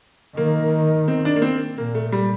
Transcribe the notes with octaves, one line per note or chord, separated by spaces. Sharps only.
D#3 A#3
C4
D4
A#3
C4
A#2 A#3
A3
G3